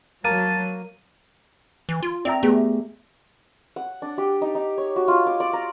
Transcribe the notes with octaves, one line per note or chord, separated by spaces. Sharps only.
F#3 A#3 A5 D#7
E3
F4
C4 D5 E5 A#5
A3 B3 G4 G#4
F#5
D4
G4
D#4
D#4
C#5
F#4
F4
D6
D5
A#5